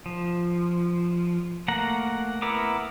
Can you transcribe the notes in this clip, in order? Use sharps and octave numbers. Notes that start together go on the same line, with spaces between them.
F3
A3 A#3 F#5 A#5
B3 E4 A#4 A#5 D6